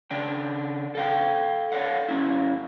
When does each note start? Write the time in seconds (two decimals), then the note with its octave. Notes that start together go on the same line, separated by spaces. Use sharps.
0.11 C#3 D4 G5
0.95 A4 F5 G5
1.72 A4 C#5 D5 F5 F#5
2.09 F#2 C#4 E4